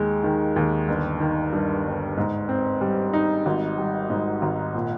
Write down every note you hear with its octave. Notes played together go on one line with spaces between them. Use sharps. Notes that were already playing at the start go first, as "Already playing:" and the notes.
Already playing: D#2 G#3
D#3
D#2
G1
D#3
G2
G1
G#2
C4
G3
D#4
G#1
G3
G#2
G#1
A#2